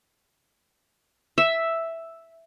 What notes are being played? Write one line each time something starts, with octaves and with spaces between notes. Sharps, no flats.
E5